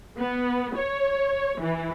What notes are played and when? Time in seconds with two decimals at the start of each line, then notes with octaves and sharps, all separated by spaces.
0.19 B3
0.77 C#5
1.61 E3